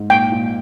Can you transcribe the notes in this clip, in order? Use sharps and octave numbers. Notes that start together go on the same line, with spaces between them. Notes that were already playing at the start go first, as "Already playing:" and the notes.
Already playing: G#2
A#2 G5
A#2